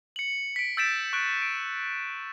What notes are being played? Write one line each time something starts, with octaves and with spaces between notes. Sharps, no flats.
C#7 F#7
B6 D7
E6 G6 A6 B6 D7 E7
C#6 F#6 D7
D7